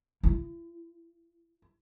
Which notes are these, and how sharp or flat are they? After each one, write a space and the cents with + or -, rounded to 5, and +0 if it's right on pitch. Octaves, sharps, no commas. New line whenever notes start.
E4 +40